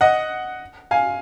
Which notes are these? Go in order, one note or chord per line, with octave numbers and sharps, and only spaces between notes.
D#5 F#5
F5 G#5